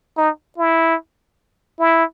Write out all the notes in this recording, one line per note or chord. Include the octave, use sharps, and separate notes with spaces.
D#4
E4
E4